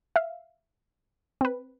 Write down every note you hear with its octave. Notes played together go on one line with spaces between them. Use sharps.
E5 F5
C4 B4